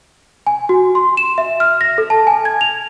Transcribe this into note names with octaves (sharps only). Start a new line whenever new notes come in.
G#5
F#4
C6
E7
E5
F6
A#6
A4
A5
G#5
G#6
F7